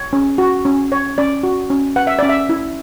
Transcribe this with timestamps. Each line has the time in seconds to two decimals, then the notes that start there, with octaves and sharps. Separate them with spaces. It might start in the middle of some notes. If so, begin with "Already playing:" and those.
Already playing: C#5
0.13 C#4
0.38 F#4
0.65 C#4
0.92 C#5
1.18 C#4 D5
1.43 F#4
1.70 C#4
1.96 B4 F#5
2.07 E5
2.19 C#4 D5
2.29 E5
2.49 E4